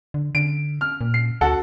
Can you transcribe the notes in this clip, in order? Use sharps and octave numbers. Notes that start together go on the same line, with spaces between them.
D3
D3 D7
F6
A#2
C7
D2 F#4 A4 F#5